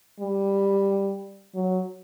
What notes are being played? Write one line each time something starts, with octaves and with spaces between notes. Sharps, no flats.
G3
F#3